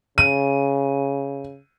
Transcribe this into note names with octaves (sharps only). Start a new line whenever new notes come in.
C#3 D#7